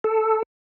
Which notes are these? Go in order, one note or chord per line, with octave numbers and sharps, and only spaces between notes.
A4